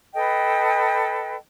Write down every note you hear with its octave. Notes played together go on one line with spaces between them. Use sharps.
A4 B4 D#5 G5